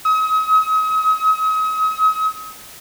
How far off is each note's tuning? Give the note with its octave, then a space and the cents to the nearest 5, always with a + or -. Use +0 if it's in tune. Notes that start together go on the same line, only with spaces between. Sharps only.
D#6 +40